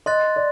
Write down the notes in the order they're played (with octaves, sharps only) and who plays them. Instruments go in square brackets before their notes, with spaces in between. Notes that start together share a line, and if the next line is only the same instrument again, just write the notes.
[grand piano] D#5 [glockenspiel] C6 F#6 A6
[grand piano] D5